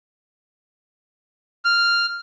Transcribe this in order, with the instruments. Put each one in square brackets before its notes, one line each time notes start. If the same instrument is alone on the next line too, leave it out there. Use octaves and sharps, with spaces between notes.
[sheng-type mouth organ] F6